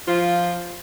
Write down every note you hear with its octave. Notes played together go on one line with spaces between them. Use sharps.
F3 F4